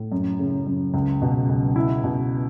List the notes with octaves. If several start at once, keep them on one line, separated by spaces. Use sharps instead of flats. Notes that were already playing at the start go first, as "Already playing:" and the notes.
Already playing: A2
F#2
C#3
F#2
C#2
B2
C#2
E4
B2